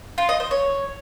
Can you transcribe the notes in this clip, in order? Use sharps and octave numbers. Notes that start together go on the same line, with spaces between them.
F4
D#5
C5
C#5